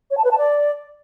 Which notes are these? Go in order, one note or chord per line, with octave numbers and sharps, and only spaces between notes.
C#5
A5
B4
A5
D5